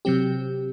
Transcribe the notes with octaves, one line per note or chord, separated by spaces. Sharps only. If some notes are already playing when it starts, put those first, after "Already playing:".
C3 F#3 C4 G4